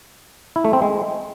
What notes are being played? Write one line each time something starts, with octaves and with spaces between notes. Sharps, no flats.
E4
A3
C4
G#3